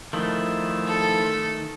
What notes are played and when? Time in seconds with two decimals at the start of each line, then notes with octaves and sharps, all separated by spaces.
0.13 D#3 F3 A3 E4
0.87 A4